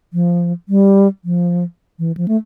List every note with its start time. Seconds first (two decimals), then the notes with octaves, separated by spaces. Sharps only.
0.13 F3
0.69 G3
1.25 F3
1.99 E3
2.17 F3
2.28 A3